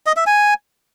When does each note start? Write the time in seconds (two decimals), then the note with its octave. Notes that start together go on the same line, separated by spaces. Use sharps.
0.06 D#5
0.16 E5
0.26 G#5